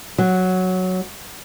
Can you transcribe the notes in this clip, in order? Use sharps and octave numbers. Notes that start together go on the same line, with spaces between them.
F#3